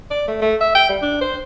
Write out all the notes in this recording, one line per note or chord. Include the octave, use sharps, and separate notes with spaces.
D5
A3
A3
E5
G5
G3
D4
C5